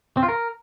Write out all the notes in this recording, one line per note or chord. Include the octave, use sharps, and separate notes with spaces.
C4
F4
A#4